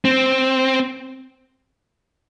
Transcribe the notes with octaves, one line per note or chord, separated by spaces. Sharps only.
C4